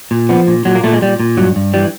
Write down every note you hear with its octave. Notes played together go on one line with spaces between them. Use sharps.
A#2
F3 B3
A#2
A#2 F#3
A#3
A#2 A3
G#3
A#2 G3
A#2
G2 F#3
G2
E3 G3